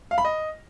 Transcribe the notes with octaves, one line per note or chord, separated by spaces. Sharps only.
F5
B5
D#5